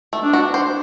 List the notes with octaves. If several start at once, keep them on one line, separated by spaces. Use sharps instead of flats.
A3
D4
F#4
C5